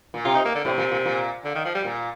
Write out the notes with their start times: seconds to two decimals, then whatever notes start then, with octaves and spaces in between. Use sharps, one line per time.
0.14 A#2
0.25 C3 F4
0.35 D#4
0.45 A#3
0.55 D3
0.65 A2 C3
0.78 A#2
0.91 A#2
1.05 A#2
1.45 D3
1.55 D#3
1.65 F3
1.75 G3
1.85 A#2